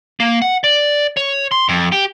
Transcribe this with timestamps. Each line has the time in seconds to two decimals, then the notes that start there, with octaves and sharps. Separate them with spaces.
0.20 A#3
0.42 F#5
0.64 D5
1.17 C#5
1.52 C6
1.69 F2
1.92 G4